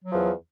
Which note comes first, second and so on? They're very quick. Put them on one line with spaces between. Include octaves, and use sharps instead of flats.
F#3 F3 E2